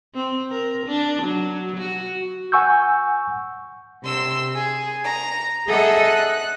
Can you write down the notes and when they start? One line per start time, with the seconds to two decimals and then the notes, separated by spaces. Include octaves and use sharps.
0.14 C4
0.51 A#4
0.87 D4
1.23 F#3
1.77 F#4
2.52 F#5 G#5 C#6 E6 G6
4.03 C3 C6 E6
4.55 G#4
5.03 A#5
5.67 G#4 A4 D#5 E5 F#5
6.07 F#6